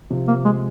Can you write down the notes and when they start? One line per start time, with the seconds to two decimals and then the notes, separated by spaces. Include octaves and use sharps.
0.10 C3 F3
0.28 A#3
0.45 G#3